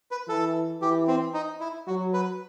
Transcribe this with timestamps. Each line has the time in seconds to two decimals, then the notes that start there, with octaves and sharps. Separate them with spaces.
0.11 B4
0.28 E3 A4
0.82 E3 G4
1.08 C4
1.34 D#4
1.60 E4
1.87 F#3 F#4
2.13 B4